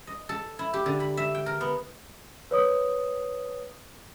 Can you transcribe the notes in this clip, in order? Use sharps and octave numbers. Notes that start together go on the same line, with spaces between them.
D#5
A4
E4
G4
D3
B5
E5
G5
A#4
B3
B4 C#5 D#6